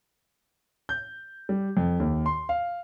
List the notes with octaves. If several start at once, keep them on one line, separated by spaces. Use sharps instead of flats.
G6
G3
F2
D#2
C6
F5